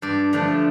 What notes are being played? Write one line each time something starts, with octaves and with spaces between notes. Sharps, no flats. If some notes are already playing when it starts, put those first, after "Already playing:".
G2 D5
D3 F3 A3 D4